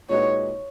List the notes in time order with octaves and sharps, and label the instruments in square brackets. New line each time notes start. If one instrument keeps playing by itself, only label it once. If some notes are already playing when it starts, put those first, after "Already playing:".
[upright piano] A#2 G#3 D#4 F#4 B4 [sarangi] C#5